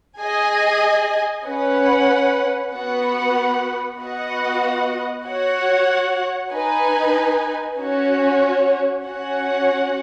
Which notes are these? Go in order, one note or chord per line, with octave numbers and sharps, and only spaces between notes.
G#4 D#5 G#5
C#4 B4 F#5
B3 F#4 B4 F#5
B3 F#4 D#5 F#5
F#4 C#5 F#5
D#4 B4 G#5
C#4 F#4 C#5
C#4 F#4 C#5 F#5